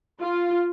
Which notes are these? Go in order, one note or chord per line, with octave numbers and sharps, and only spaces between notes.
F4